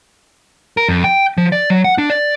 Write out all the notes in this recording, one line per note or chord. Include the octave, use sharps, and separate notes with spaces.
A#4
F2
G5
F3
D5
F#3
F#5
D4
D5